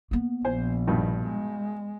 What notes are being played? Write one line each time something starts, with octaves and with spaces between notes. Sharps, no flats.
A#3 B3
A#1 C5 G#5
G2 B2 D#3
G#3